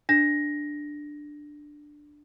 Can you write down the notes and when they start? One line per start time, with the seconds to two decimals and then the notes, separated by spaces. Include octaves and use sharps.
0.09 D4 A#6